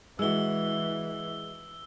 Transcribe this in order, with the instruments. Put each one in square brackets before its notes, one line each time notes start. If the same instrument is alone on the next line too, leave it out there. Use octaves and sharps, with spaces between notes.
[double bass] E3 [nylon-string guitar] G#3 F#4 [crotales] E6 G7